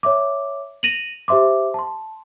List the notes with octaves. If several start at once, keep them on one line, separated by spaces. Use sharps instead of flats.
C#5 E5 D6
A#6 D#7 F7 F#7
G4 C5 E5 C6 D6
A5 C6